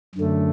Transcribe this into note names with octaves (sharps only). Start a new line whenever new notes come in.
F#2 D3 A3